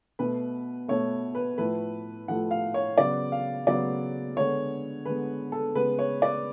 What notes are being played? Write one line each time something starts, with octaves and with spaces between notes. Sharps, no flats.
B2 A3 B4
B2 A3 C#5
B4
A2 F3 A3 B4
A2 F3 A3 F#5
F5
C#5
C#3 F#3 B3 D5
F5
C#3 F#3 B3 D5
D3 G#3 B3 C#5
D3 G#3 B3 B4
A4
C#3 G#3 B3 B4
C#5
D5